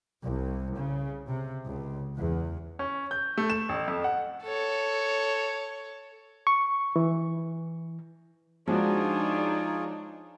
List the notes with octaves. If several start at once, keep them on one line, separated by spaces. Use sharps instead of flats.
C2
C#3
C3
C#2
E2
C#4
G6
A3
E7
A1
F2
F#5
A4 C#5
C#6
E3
F3 G#3 D4 D#4 F4 F#4 G#4 C#5